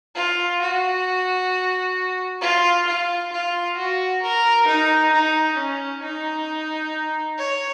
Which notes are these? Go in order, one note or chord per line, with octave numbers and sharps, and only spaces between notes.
F4
F#4
F4
F4
F4
F#4
A#4
D#4
D#4
C#4
D#4
C#5